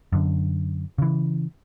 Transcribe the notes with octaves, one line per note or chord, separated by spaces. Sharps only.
F#2 D3
C#3 E3